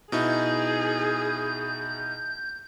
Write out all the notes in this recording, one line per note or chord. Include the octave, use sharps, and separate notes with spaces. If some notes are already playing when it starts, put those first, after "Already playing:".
B2 D#4 E4 G#4 G6